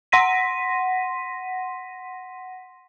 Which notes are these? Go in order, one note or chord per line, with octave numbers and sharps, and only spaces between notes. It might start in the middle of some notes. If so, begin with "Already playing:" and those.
F#5 C6 A#6 B6 D#7